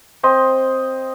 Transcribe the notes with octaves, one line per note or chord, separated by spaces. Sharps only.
C4 D#5 C6